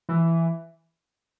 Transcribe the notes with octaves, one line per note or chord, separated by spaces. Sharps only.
E3